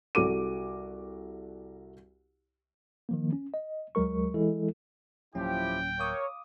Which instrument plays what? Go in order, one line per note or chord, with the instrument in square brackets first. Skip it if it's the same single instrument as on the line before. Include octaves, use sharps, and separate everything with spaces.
[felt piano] C2 F#4 A4 D6 D#7
[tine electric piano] D#3 F3 A#3
C#4
D#5
D2 F#3 G#3 A#4 C#6
E3 G#3 E4 A4
[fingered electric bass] D1 F#3 A#3 [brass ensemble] F3 E4 G4 [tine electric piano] C#4 [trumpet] G5
[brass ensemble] A#4 C#5 [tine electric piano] F5 D6 D#6